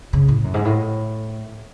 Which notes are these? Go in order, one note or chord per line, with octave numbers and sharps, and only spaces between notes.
C#3
A2
F#2
G#2
A2